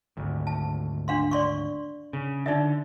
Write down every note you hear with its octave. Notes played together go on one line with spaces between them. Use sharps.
G#1 D2
A5
D4 F5 C6
D5 C6 C#6
C#3
D3 D#4 D5 E5